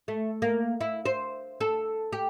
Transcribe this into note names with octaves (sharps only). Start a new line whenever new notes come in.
A3
A#3
E4
C5
A4
G4